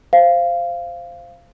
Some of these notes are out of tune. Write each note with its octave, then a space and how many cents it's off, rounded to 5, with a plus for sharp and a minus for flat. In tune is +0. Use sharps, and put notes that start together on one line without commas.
C5 +0 F5 -15